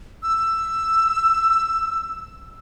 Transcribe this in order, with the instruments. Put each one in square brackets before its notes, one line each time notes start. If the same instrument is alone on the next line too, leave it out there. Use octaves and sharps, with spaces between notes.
[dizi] E6